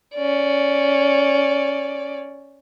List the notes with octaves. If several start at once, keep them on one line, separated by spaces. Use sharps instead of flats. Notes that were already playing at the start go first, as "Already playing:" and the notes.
C#4 D5